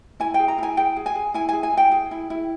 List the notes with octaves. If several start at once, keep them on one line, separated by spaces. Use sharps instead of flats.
E4 G#5
G#4 G5
A#5
E4 G#5
G#4 G5
G#4
G#5
G#4
E4 G#5
G#4 G#5
G#5
E4 G5
G#4
E4
E4